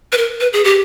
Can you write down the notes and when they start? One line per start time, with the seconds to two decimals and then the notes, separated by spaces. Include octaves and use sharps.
0.12 B4
0.18 A#4
0.40 B4
0.53 G#4
0.64 G4